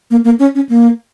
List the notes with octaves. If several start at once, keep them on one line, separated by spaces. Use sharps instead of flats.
A#3
A#3
C#4
C#4
A#3